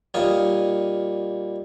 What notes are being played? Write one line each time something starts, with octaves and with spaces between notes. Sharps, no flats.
A#2 G3 D#4 C#5 F5 D#6